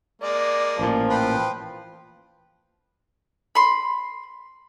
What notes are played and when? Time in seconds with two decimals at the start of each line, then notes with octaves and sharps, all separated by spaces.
0.22 G#3 A#3 D5
0.79 A1 A#2 F3
1.10 B4 C5 G5
3.55 B5 C6